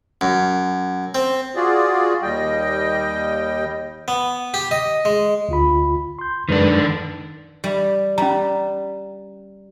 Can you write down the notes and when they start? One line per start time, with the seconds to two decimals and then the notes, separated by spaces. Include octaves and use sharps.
0.21 F#2
1.15 C4
1.56 F4 F#4 G#4 D5
2.22 D#2 G3 D#5 G5
4.08 B3
4.54 G4
4.71 D#5
5.05 G#3
5.49 D2 F4 B5
6.19 C6 G6
6.49 F#2 D#3 G#3 D4 B4
7.64 G3
8.18 G3 C#4 A#5